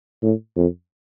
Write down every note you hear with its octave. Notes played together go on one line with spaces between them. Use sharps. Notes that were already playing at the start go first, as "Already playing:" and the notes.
A2
F2